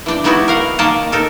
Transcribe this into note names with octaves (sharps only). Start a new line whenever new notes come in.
E3 D4 G5
G#3 B3 D#4 E4 F#4 G4
A#4 F5 F#5
D#3 A#3 A#4 D#5 F#5 A5
D#4 A4 A#4